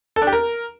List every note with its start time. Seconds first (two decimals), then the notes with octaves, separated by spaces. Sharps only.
0.16 A4
0.22 D4
0.27 G4
0.32 A#4